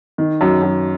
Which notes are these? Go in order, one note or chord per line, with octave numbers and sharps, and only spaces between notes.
D#3
F#2
F#2